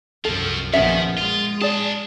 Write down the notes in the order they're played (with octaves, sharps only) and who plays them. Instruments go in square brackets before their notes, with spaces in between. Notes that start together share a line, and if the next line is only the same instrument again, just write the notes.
[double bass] C2 F#2 [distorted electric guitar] F3 C4 [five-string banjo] A4
[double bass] A#1 F3 [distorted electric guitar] D#3 [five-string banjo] B3 C#4 E5
[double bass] G#3 [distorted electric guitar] F4
[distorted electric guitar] D#4 A5 [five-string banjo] G#4 D5